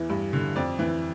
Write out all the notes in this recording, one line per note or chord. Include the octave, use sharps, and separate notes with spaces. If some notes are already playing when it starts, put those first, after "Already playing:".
Already playing: E2 E3
G2
D3
F2 D5
E3